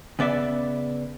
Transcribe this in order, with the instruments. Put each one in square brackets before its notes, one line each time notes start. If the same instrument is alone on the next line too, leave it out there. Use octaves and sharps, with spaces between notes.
[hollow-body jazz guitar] C#3 B3 D5 E5